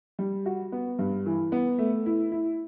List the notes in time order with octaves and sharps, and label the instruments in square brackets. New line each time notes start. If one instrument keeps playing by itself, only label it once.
[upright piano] G3
F#4
B3
G2
E3
B3
A3
E4
E4